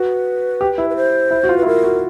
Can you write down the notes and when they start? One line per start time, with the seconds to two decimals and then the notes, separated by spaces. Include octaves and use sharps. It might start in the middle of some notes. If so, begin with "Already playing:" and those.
Already playing: F#4 B4
0.61 G4
0.78 E4
0.90 B4
0.96 C5
1.31 E4
1.43 F#4
1.49 F4
1.57 B4
1.62 E4
1.66 F4 A#4
1.84 F#4